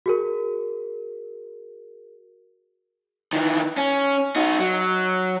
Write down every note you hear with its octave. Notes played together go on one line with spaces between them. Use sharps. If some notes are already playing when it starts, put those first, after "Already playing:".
F#4 G#4 A#4
D#3 E3
C#4
D#4 F#4
F#3